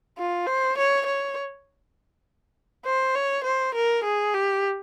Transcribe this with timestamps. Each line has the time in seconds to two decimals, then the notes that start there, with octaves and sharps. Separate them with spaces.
0.18 F4
0.46 C5
0.77 C#5
1.06 C#5
2.85 C5
3.15 C#5
3.44 C5
3.74 A#4
4.03 G#4
4.34 G4